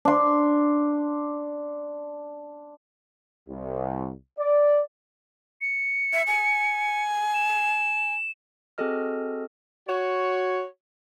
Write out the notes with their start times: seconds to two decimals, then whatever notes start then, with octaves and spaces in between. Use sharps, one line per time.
0.05 D4 C6
3.48 C2
4.39 D5
5.61 C#7
6.13 E5
6.27 G#5
7.34 E7
8.78 C4 F#4 G#4 A4 D#5 F6
9.87 F#4 C#5